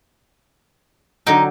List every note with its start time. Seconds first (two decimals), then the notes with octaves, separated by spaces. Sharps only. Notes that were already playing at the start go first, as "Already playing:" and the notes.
1.27 D3 F#3 D#4 G5